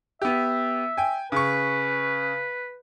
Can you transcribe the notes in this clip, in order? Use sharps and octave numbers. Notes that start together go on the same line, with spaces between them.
B3 G4 E5
G5 G#5
C#3 B4 C#6